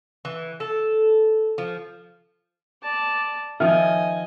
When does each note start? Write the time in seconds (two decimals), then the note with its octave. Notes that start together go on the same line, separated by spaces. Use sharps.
0.25 E3
0.60 A4
1.58 F3
2.83 D5 A5
3.60 D#3 F3 D#5 E5 G#5 F6